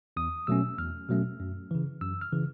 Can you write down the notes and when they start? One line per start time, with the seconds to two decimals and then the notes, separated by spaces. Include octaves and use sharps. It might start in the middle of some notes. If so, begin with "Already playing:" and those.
0.16 E2 D#6
0.47 B2 F#3 A3 C#4 E6
0.78 E2 F6
1.09 B2 F#3 A3 C#4
1.40 F#2
1.71 C#3 E3
2.01 F#2 E6
2.21 F6
2.33 C#3 E3